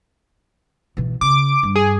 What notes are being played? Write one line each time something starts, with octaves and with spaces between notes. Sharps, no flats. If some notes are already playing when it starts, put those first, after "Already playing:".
B2 E3
C#3 D6
G2
G#4